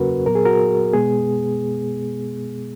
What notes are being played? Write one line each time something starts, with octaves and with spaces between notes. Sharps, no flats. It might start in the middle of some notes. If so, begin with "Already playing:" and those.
Already playing: E2 C#3 F#3 A#3 C#4 F#4 A#4 B4
A#2 F#3 B3 A#4
G#4
F#4 A#4
B2 G#3 B3 G#4